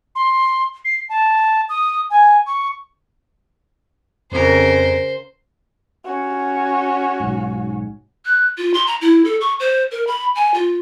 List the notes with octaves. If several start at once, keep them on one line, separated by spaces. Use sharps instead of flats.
C6
C7
A5
D#6
G#5
C#6
F2 C#3 A#4 C5
C#4 F#4
B1 G#2
F#6
F4
C6
A#5
E4
A4
C#6
C5
A#4
B5
G#5
F4